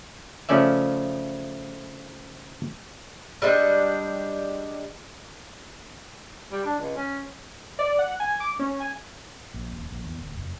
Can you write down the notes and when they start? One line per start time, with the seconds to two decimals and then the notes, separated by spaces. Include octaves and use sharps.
0.49 C#3 F3 A3 C#4 D5 E5
3.42 G3 G#3 D4
6.52 G3
6.65 D4
6.79 C#2
6.96 C#4
7.79 D5
7.99 F#5
8.20 G#5
8.40 D6
8.59 C#4
8.80 G#5
9.54 A#1
9.73 D#1
9.91 A#1
10.05 E2
10.18 D1
10.37 F1